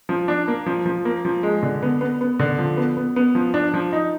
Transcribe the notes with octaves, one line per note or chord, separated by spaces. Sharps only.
F3
D4
A#3
F3
F3
A#3
F3
G#3
D3
B3
B3
B3
D3
F3
B3
B3
B3
F3
D4
F3
D#4